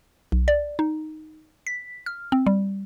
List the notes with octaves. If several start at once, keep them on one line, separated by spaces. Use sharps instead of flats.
B1
D5
D#4
B6
F6
C4
G3